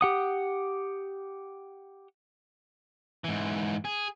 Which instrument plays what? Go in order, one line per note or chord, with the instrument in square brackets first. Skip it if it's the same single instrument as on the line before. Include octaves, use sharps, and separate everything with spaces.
[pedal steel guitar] G4 F#5 D#6
[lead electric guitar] G#2 E3
G#4